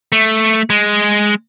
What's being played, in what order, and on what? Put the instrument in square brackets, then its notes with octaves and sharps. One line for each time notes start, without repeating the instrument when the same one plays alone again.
[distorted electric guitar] A3
G#3